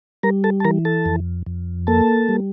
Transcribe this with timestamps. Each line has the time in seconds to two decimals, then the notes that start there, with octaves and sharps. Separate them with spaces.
0.23 G3 A#4 A#5
0.44 A4 A5
0.60 A5
0.65 E3 A#4 A#5
0.85 A4 A5
1.06 F2
1.46 F2
1.87 A#3 A4 A5
2.29 G3